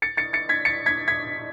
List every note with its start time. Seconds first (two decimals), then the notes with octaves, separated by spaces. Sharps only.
0.02 A6 C#7
0.17 A6 C#7
0.33 A6 C#7
0.49 G#6 B6
0.65 A6 C#7
0.86 G#6 B6
1.08 G#6 B6